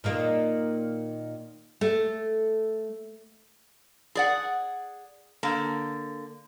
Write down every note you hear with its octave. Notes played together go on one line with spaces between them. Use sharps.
A#2 D#3 A#3
A3
G#4 D5 F#5
D3 A#3